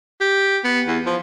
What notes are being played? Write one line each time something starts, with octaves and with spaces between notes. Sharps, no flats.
G4
B3
E2
F3